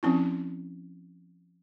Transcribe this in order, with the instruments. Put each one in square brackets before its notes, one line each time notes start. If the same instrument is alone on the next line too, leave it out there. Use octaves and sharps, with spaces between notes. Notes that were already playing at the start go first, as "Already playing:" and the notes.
[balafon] F3 C4 C#4 E4